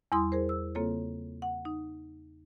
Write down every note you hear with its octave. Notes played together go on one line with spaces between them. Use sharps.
E2 G3 E4 C6 D#6
G#4 A#4 C5
E6
C#3 A#3 C4 F4 A4 C#5
F#5
D#4